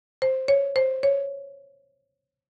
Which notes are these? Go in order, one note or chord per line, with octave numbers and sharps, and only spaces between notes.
C5
C#5
C5
C#5